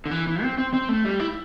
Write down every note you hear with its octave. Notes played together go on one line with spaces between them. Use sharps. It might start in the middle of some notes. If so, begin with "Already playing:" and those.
D3
E3
E3
C4
C4
C4
A3
G3
E4